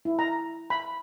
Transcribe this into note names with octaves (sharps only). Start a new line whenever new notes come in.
E4
A#5
B5